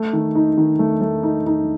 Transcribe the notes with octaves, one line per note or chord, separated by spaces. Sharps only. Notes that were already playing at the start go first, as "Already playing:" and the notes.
Already playing: A3
D#3
D#4
D#3
A3
A3
D#4
D#4